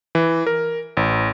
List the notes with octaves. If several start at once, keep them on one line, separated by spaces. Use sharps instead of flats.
E3
A#4
A1